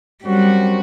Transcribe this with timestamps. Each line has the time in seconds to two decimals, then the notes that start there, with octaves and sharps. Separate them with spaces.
0.24 F#2 F#3 G3 C4 F#4